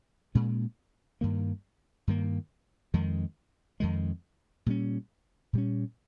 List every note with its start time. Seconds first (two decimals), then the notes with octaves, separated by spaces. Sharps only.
0.35 A#2 G#3 C#4
1.21 G2 D#3 A#3
2.07 G2 D#3 A#3
2.94 F2 D#3 G#3
3.80 F2 D#3 G#3
4.66 A#2 G3 C#4
5.53 A#2 G3 C#4